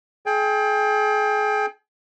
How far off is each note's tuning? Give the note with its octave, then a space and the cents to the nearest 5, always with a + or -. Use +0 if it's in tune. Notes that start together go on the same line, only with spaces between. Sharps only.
G#4 +35 G5 +25